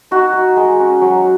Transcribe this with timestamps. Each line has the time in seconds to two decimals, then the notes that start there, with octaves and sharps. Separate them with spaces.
0.11 D#4 F#4
0.33 D#4
0.57 G#3
0.79 C#4
1.01 F#3